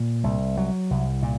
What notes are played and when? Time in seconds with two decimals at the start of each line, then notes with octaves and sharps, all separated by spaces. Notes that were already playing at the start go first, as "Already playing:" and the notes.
Already playing: A#2
0.24 C2
0.57 F#3
0.91 C2
1.23 A#2